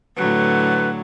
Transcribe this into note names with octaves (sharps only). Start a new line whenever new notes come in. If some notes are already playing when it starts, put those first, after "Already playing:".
A2 D3 F#3 B4